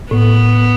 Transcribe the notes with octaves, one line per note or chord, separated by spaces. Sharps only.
A2 B3